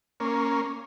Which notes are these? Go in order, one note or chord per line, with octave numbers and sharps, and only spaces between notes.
A#3 C#4